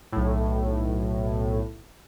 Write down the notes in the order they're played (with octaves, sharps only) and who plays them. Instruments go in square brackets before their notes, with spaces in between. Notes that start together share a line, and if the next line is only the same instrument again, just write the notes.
[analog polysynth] B1 A2